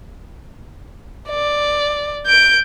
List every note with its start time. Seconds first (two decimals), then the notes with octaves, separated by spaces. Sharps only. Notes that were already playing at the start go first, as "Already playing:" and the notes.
1.29 D5
2.27 G6 D7